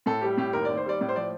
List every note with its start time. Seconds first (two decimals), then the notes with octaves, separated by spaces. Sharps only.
0.06 A2 A4
0.21 G3 G4
0.37 A2 G4
0.53 D#2 A#4
0.65 D#2 D5
0.77 C5
0.86 G3 D5
1.01 A2 D5
1.09 C5
1.16 F3 D5